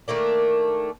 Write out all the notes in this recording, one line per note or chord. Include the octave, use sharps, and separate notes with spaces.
D#3 A3 A#3 D4